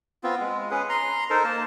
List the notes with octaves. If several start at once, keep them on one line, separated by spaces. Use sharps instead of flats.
B3 C4 F4
G#3
C#4 G#4 B4
A#5 C6
D#4 A4 A#4 C5
A#3 A5